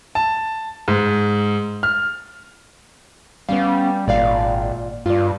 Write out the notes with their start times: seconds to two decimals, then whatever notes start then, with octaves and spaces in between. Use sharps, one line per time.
0.15 A5
0.88 G#2
1.83 F6
3.49 G3 B3 C#4 F5
4.08 G#1 A#2 D5 F5
5.06 G2 F4 D5